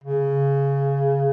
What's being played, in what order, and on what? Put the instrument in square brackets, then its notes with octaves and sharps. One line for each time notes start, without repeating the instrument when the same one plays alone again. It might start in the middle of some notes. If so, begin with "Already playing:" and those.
[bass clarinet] C#3